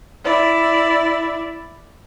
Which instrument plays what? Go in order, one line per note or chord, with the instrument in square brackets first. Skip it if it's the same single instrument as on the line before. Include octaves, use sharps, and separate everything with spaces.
[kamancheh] E4 D5